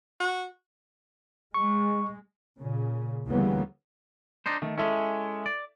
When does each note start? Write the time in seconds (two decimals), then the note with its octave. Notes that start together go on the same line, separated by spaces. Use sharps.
0.20 F#4
1.54 G#3 C#6
2.56 A#2 C#3
3.26 D2 C#3 E3 G3 A#3 B3
4.46 D4 D#4 C5
4.62 D#3 A3
4.78 G#3 C#4 E4 A4 E5
5.46 D5